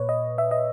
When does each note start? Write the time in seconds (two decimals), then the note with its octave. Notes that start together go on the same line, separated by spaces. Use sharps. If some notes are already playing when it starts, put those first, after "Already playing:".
Already playing: A#2 B4 C#5
0.09 D#5
0.38 E5
0.51 D#5